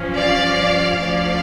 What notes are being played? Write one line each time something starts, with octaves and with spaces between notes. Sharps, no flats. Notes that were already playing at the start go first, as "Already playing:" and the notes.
Already playing: G2 F3 C#4
D5 F5
D2 D3 F3 C#4 D5 F5